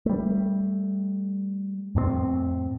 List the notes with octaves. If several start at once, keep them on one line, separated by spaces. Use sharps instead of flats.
G3 A3
F2 A2 A3 C4